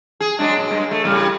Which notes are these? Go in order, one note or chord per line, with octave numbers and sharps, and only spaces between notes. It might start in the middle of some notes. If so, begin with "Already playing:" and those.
G#4
F#3 G#3 D4
A#2
G2 G#3
A3
A2 C#3 G3